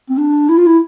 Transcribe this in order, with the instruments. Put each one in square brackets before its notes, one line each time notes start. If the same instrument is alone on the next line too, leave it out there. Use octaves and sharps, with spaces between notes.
[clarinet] C4
D4
E4
F4
E4